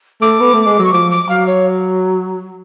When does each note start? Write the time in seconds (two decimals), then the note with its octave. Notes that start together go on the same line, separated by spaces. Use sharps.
0.21 A3 D6
0.40 B3
0.53 A3
0.66 G#3
0.79 F#3 C#6
0.92 F3 D6
1.10 D6
1.29 F#3 F5
1.46 C#5